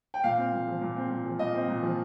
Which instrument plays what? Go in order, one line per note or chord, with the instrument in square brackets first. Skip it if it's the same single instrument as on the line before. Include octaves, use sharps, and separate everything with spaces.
[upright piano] G5
A#2 F5
C4
A#2
F3
A#2
C4
A#2
F3
A#2 D#5
C4
A#2
F3